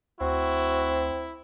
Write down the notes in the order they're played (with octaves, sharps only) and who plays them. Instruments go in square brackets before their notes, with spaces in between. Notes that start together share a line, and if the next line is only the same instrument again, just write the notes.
[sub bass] D2 [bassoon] C4 [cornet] E4 [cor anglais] F#4